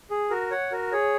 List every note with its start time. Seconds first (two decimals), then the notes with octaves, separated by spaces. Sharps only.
0.11 G#4
0.30 F#4 A#4
0.51 C#5 F#5
0.71 F#4 A#4
0.92 G#4 C#5